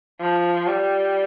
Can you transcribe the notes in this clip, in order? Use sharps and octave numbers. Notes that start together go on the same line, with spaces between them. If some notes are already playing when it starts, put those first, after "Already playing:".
F3
G3